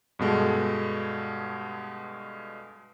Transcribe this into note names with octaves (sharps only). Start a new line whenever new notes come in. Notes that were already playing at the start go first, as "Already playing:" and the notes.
G2 B2 G#3 A4